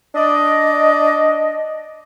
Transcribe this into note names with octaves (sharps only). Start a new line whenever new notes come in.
D4 D5 D#5